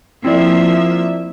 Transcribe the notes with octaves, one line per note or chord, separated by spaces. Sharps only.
F3 A#3 C4 E4 D5 E5